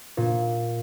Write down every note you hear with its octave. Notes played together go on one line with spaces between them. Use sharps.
A#2